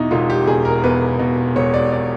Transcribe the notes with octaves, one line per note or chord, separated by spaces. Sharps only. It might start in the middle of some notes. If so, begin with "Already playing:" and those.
Already playing: E2 B2 D#4 E4
E1 F4
G4
E1 G#4
A#4
E2 B4
B2
E1 C#5
D5
D5